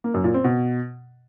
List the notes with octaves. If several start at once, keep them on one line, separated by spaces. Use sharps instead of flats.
A#3
F#2
A#2
C4
B2